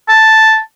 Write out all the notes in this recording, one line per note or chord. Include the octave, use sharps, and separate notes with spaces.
A5